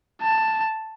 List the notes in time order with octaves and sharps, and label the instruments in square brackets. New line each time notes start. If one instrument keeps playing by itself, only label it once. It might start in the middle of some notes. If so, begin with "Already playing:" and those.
[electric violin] A5